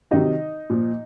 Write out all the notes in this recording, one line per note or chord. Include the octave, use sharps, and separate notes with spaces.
C3 D#3 F#3 D#4 D#5
A#2 F3